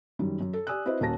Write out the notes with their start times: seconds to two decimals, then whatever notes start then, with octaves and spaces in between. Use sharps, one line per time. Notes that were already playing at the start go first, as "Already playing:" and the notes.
0.19 F#2 D#3 G3
0.41 F#2
0.53 A4
0.67 G4 D5 G#5 D#6 E6 F#6
0.85 C4 E4 F#4 B4 C5 D#5
1.00 D#1 A#3 C#4 F#4 A5 A#6